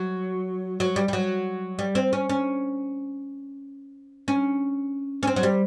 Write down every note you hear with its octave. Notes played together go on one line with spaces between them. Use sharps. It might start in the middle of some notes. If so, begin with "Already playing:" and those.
Already playing: F#3
F#3
G3
G3
F#3
G3
C4
C#4
C#4
C#4
C#4
C4
F#3
G3